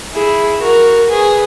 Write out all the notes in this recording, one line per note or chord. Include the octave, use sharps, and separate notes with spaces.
E4 G#4
F#4 A#4
G#4 B4